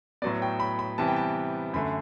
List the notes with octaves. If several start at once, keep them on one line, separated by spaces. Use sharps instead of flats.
A2 F#3 B3 D5
G5
B5
B5
C3 E3 G3 B3 A5
G5
A5
F#2 D3 A3 B5